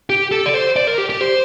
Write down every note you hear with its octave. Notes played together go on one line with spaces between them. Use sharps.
G4
A4
D5
C5
D5
A#4
G4
G4
C5